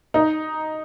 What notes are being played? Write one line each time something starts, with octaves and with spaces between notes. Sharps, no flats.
D#4